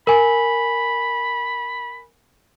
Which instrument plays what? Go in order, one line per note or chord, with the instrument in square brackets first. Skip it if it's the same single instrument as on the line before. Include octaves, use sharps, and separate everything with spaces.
[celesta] A#4 G#5 [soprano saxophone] B5